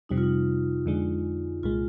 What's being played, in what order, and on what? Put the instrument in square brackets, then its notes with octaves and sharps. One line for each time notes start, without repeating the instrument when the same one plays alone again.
[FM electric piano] F2 C3 G3 [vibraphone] D#4
[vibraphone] F4
D#4
[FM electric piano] F2 D3 G#3
[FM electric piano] C2 A#2 G#3 [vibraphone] F4